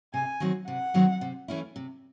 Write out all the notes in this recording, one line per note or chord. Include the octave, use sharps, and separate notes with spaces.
C3 G#5
D#3 F#3 C4 F#4
C3 F#5
D#3 F#3 C4 F#4
C3
E3 A3 C#4 E4
C3